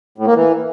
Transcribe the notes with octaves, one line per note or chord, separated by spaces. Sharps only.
A2
A#3
E3